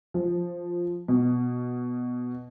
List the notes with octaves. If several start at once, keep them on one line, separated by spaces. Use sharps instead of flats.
F3
B2